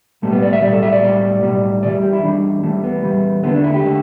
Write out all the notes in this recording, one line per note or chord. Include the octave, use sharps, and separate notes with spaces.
B1 A2 G3 A3
B3
D5
E5
B1 A2 G3 D5
A4
E5
D5
B1 A2 G3
B1 A2 G3
E2 E3 G3 D5
G4
E4
E2 E3 G3 D4
E2 E3 G3 A3
B3
E2 E3 G3
E2 D3 A3 B3
D4
E4
G4
D3 A3